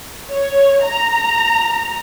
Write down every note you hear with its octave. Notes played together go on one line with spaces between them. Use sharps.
C#5
A#5